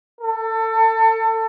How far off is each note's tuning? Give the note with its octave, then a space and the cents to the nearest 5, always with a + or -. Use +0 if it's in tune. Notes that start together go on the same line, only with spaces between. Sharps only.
A4 +25